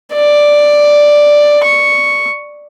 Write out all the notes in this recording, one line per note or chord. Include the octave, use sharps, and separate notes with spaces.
D5
C#6